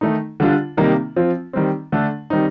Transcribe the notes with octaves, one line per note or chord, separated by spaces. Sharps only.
D#3 A3 D#4
D3 G3 D4 F4
C3 D#3 G3 A#3 D#4
F3 C4 F4
D#3 G3 C4
D3 A3 D4
D#3 G3 C4 D#4